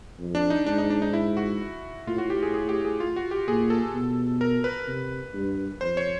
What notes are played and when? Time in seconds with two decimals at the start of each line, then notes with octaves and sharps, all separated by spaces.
0.19 F2
0.35 D4
0.50 D#4
0.66 G#2 D4
0.78 D#4
0.90 D4
1.02 D#4
1.13 E4
1.37 F#4
2.07 A2 F4
2.18 F#4
2.30 G4
2.42 G#4
2.54 G#4
2.69 G4
2.85 G#4
3.00 F4
3.16 F#4
3.31 G4
3.48 A#2 G#4
3.70 A4
3.94 B2
4.41 A#4
4.64 B4
4.88 C3
5.34 G2
5.81 F2 C5
5.97 C#5